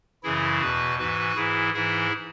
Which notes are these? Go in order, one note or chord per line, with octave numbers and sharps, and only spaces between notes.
F#2 C#3 E3 E4 G#4
E2 B2 F#4 B4
G#2 E3 F#4 B4
G#2 E3 E4 G#4
G#2 E3 E4 G#4